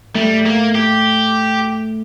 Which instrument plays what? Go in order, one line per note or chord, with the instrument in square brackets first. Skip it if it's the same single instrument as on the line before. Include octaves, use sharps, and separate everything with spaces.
[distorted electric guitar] G3 [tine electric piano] A3
[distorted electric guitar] A#3
G4